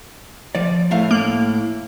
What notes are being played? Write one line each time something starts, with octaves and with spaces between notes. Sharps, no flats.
F3 D5
A2 A3 F5
A#3